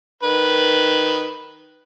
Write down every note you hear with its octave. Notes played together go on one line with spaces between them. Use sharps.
D#3 B4